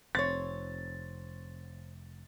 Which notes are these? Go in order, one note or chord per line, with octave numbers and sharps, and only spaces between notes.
F1 C4 C#5 A6